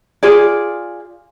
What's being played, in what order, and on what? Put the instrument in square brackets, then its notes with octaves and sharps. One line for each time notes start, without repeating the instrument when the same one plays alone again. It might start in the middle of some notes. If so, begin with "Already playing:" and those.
[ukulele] F4 G#4 D5